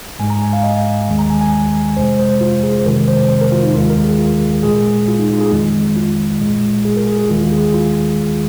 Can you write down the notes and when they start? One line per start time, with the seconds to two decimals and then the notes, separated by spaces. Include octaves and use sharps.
0.19 G#2 G#3 G#5
0.30 A#5
0.42 G#5
0.53 F5
0.63 D#5
1.08 D#2 D#3 G#3
1.19 A#5
1.30 G#5
1.41 G#5
1.97 F2 C3 G#3 C5
2.19 C5
2.41 F4
2.63 G#4
2.79 C5
2.85 F2 C3 D#3 G#3 A#4
3.08 C5
3.30 C5
3.41 A#4
3.52 F4
3.63 D#4
3.74 D#2 D#3 G#3 F4
3.90 A#4
4.04 G#4
4.19 F4
4.63 C2 A#2 G#3 G#4
5.08 F4
5.19 D#4
5.33 F4
5.41 G#4
5.51 F2 D#3 G#3
5.96 F4
6.41 C2 A#2 G#3
6.85 G#4
6.97 A#4
7.07 G#4
7.18 G#4
7.29 D#2 D#3 G#3 F4
7.41 F4
7.52 G#4
7.63 G#4
7.74 F4